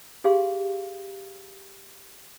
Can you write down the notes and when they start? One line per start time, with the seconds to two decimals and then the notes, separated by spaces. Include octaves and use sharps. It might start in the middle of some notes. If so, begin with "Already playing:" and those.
0.24 G4 G#4 F5 C6